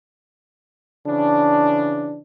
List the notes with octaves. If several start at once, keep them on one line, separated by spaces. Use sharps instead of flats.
C#3 E3 D4